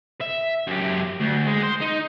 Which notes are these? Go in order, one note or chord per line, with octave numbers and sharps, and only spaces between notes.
E5
F#2 G4
D2
G#3
C5
D#4